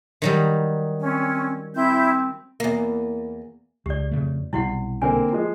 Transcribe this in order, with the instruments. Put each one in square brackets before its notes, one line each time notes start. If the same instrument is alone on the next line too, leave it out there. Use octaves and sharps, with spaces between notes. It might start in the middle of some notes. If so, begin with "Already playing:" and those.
[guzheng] D#3 F#3 G3
[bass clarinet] C4 [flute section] C#4
[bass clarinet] C4 [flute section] E4 G6
[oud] E2 A#3
[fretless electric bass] C#2 [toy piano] G4 D5
[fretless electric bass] F2 C#3 A3
[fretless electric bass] B1 C3 G3 [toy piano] E4 F#4 F#5
[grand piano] D3 A#3 C4 [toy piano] G#5
[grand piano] F3 G#3